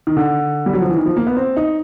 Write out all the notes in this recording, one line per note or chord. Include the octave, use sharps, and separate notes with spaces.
D#3
D3
G3
F#3
F3
E3
D#3
F3
A#3
B3
C4
D#4